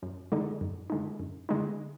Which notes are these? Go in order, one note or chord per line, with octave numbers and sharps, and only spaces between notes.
F#2
D3 G#3 D#4
F#2
D3 G#3 D#4
F#2
D3 G#3 D#4